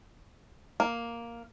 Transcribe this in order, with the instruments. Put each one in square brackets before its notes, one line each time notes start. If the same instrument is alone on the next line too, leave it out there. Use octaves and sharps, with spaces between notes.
[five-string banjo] A#3